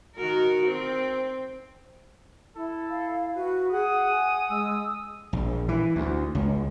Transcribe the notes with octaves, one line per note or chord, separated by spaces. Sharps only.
D#3 F#4 A#4
C4
E4 A4
F5
F#4 B4
G#4 F#5 D#6
G#5
G#3 E6
A#1
E3
D2
C#2